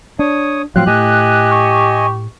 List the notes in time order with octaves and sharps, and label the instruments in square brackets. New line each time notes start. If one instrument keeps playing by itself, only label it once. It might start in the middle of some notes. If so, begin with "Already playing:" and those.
[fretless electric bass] D4 [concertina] C#5 D#6
[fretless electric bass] A2 F3 F#3 [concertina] C4 F5 [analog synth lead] F#6
[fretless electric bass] A2 [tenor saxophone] G4 [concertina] D#5 G#5
[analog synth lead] C#6